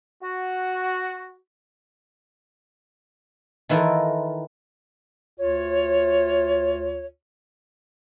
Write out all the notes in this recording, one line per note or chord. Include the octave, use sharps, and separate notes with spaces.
F#4
D#3 E3 E4 F4 A4 A#4
D2 F4 C#5